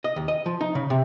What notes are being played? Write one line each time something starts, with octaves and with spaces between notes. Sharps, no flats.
D#5
D#2
D#5
F3
D#4
C#3
C3